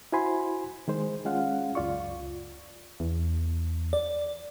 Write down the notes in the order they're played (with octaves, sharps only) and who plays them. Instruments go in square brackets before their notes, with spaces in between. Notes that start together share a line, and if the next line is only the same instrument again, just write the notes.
[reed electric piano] E4 F#4 C5 G#5 B5 C6
D#3 G#3 C5
G#3 C#4 F4 F5 F#5
C#2 F#2 F4 D5 C#6
[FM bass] E2
[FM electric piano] D5